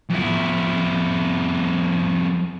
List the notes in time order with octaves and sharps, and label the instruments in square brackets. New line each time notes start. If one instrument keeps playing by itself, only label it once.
[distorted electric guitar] F2 E4